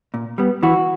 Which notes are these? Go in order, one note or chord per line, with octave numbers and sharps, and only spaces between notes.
A#2
G3 B3
E3 F#4